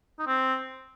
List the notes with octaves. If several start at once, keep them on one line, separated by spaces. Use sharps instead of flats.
D#4
C4